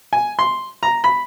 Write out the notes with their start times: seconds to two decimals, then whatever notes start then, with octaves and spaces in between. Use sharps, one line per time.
0.13 G#5
0.39 C6
0.83 A#5
1.04 B5